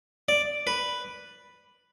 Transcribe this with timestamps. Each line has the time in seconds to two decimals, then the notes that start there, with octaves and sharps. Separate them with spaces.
0.29 D5
0.67 B4